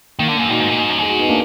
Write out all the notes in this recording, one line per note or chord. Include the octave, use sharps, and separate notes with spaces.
D#3 A#3
D3
F#2 A#3
A#2 D#4 F#4
G#2
A#2
G#2
F#2
G#2 G#4
D#4 F#4
B3 D#4
A#3 D4